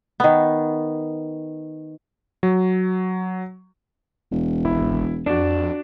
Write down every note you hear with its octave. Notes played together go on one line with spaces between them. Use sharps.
D#3 B3
F#3
E1
G#1 E4
F2 D4 F#4 D5